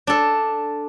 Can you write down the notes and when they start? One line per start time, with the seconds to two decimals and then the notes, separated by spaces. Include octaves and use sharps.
0.07 D4 A4